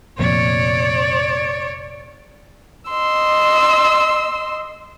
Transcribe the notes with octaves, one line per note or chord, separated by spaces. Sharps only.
F1 F2 A#2 C#5 D5
D#5 C6 E6